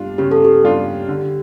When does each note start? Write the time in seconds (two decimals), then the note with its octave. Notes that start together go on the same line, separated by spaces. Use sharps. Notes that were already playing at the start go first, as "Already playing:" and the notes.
Already playing: G3 D4 F4
0.18 C#3 G4
0.31 A4
0.45 G4
0.64 G3 D4 F4
1.08 D3